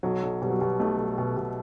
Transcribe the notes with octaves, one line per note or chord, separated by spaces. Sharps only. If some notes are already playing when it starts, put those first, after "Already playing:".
B1 F#3
B1
B2 G3
F#3
B2 G3
B1 A3
B1
B2
B2